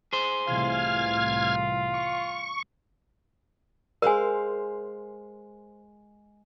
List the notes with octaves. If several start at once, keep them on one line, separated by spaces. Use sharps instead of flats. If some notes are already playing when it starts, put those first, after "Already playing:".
G#4 C5
C2 A2 E3 F4 F6 G#6
C#6
G#3 A#4 C5 F5 G#5